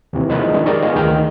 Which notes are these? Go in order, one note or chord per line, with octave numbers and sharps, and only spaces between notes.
D#2 C3 E3
E3 F3 G#3 A#3 D#4 B4
D#3 G#3 D4
G4 A#4 D5 D#5 B5 C#6
D#3 G#3 B3 F4 G#4
D2 D#3 D#4 G5 F6